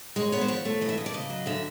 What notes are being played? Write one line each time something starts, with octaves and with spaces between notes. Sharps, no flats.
G#3 C#5
B3 C#5
C5
F3 C#5
A3
E3 D#5
E5
A3 D#5
D5
C#3 D#5
F#3
D3 E5